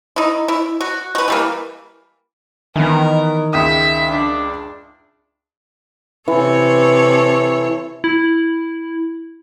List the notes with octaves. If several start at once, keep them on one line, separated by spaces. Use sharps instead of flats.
D#4 E4
E4
F#4
F#4 B4
E3 G3 A#3
D#3 E3 B3 A#4
C#2 E5 G5 D#6
D4
C3 E3 A4 C#5
E4